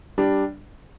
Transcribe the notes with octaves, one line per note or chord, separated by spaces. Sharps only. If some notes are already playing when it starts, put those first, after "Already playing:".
G3 D4